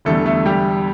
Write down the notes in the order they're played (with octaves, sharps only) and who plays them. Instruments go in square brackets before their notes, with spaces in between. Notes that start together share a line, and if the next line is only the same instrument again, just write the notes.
[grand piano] E1 E2 D3 G3 A3 A4
A3 A4
G3 G4